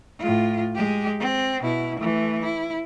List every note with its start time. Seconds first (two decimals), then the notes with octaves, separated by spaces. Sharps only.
0.19 A2 F4
0.75 G#3 G4
1.20 C4
1.62 B2 E4
2.00 E3 A3
2.42 E4